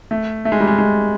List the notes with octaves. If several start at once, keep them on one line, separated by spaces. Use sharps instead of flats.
A3
A3
G#3
G3
G#3
G#3